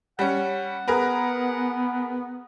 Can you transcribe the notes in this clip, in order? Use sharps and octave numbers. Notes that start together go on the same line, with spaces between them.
G3 C#4 F#5
B3 G#4 A#4 B4